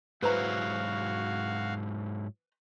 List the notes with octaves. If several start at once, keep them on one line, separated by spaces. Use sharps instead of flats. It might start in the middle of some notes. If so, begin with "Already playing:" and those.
G#2 F#3 E4 F#4 B4 C5 F5 A#5